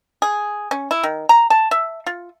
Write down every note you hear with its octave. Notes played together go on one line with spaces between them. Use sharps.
G#4
C#4
E4
D#3
A#5
A5
E5
F4